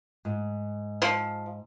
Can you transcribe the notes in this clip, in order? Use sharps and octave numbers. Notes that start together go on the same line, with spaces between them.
G#2
F3